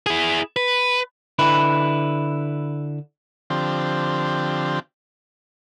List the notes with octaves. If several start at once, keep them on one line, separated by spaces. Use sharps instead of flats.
E4 G#4
B4
D3 E4 B4
D3 F3 C4 G4